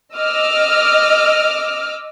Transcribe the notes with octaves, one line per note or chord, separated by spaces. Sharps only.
D#5 D6 E6 F6